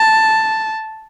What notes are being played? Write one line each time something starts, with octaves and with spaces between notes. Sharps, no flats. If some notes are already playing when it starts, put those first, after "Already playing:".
Already playing: A5